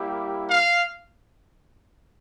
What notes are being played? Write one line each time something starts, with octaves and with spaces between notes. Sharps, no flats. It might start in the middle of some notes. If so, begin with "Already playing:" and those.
Already playing: G3 A#3 E4 G4
F5